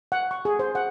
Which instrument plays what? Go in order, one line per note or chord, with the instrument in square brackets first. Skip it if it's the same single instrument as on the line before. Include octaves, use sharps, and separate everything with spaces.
[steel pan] F#5
C#6
G#4
C5
F#5